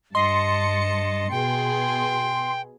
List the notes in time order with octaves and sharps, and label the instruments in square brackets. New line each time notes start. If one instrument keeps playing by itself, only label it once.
[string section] G2 A5 C#7 [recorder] D#5 [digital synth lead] C6
[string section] B2 G#4 [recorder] G5